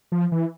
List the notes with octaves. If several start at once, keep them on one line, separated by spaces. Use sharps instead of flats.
F3
E3